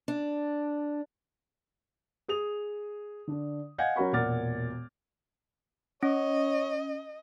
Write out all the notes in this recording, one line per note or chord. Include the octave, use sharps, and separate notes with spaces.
D4
G#4 D#6 F7
D3 D4
D#5 F5 F#5 G#5 G6 G#6
F#3 C#4 F#4 A#4 B5 C#6
E1 A#2 F#5 D6 F6 A6
C#4 C#5 D#5